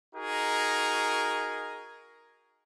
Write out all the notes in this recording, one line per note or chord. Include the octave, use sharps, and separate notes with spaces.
D#4 F#4 G#4 A#4